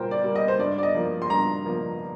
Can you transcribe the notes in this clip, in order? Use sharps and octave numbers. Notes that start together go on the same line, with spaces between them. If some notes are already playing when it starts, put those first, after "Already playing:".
Already playing: A#2 G3 A#3 A#4 C5 G5
D5
G3 A#3
D#5
C5
G2 D5
D5
D#5
F3 A#3
C6
G2 A#5
F3 A#3